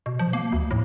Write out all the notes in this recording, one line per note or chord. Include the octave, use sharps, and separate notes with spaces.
B2
F3
A#3
D2
A2